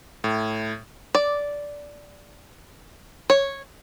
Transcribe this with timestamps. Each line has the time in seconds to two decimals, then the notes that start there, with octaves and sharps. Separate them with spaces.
0.24 A2
1.15 D5
3.30 C#5